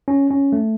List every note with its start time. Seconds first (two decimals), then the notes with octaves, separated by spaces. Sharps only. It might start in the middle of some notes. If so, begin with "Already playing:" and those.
0.08 C#4
0.30 C#4
0.53 A3